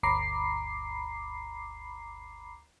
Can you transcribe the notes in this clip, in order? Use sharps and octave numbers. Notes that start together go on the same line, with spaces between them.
G1 D2 A#5 B5 D6 C7